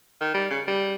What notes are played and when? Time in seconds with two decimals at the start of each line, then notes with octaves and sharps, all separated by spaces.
0.21 D#3
0.34 G3
0.50 C#3
0.67 G3